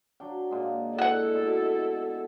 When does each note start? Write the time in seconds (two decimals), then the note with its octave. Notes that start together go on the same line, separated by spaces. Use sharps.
0.20 F#3 D4 G5
0.51 A#2 G#3
0.98 E4 F#4 A4 F#5
1.35 B2